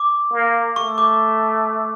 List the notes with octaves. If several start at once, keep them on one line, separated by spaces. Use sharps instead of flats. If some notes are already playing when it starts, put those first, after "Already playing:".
Already playing: D6
A#3
A3 C#6
D6